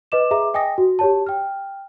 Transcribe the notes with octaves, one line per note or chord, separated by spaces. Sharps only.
B4 D#5 D6 E7
G#4 E5 A#5 D6
D#5 G5 G#5 D#6 A#6
F#4
G4 C#5 A5
G5 F6